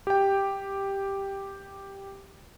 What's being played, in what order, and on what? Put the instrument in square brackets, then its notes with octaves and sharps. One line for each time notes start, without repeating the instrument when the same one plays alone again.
[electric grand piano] G4 G5